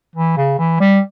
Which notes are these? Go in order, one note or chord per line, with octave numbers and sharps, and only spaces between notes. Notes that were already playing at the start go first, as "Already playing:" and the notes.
E3
C#3
E3
G3